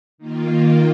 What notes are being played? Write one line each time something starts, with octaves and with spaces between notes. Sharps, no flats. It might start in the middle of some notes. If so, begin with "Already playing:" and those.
D#3 A#3 F4